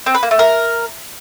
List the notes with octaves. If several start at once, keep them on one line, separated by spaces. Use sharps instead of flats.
C4
B4
A#3
A3
A#4